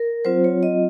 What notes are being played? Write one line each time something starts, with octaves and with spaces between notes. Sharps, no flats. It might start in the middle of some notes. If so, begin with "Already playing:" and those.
Already playing: A#4
F#3 C4 F4 C5
C#5
D#5